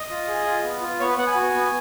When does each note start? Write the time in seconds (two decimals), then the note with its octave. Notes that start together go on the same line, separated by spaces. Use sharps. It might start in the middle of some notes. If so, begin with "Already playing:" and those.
Already playing: D#5
0.10 F4
0.28 G#4
0.46 F4
0.64 B3
0.81 F4
1.00 B3 C#5
1.09 B4
1.18 B3 F#5
1.27 G#5
1.35 F#4
1.54 B3